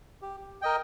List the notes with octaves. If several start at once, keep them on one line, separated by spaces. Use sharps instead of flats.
G4
A#4 D#5 G5